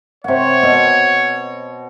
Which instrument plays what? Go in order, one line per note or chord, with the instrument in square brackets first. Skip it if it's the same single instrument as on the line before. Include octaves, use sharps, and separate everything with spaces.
[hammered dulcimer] C3 F#5 [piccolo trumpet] C#5
[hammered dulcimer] B2